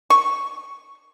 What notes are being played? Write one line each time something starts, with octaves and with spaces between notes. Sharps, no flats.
C#6